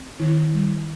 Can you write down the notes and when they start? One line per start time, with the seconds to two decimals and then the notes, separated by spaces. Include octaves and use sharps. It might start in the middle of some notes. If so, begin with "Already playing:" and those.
Already playing: C4
0.19 D#3 E4
0.53 G3